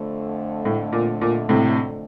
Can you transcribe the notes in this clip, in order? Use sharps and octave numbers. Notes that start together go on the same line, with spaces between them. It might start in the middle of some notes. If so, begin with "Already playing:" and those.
Already playing: F2 D3 A3
A2
A#2
A#2
A2 C3